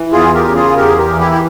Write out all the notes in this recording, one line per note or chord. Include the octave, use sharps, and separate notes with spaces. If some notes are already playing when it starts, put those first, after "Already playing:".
Already playing: E3
E2 F4 G#4
G4 A#4
C#3
F4 G#4
E2 G4 A#4
G#4
G4 A#4
E3
E4 G4
G4